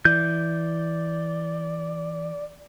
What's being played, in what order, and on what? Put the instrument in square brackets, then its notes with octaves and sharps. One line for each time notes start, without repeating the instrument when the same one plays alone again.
[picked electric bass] E3 [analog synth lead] D5 [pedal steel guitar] G6